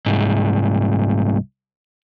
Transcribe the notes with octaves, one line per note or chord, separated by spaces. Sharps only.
C2 G#2